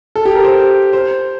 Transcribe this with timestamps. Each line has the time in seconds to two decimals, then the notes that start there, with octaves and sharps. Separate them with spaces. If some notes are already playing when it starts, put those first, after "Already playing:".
0.15 A4
0.25 G4
0.35 A#4
0.45 C5
0.93 C5